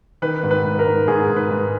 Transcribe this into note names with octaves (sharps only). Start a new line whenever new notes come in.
D#3 B4
G#2
B4
G#2
A#4
G#2
G#2 G#4
G#2
B4
G#2